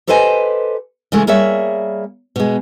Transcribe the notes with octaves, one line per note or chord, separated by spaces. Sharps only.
G4 A4 B4 C5 D#5 G#5
C#3 E3 G#3 A3
G3 A#3 G#4 C#5 E5
B2 G#3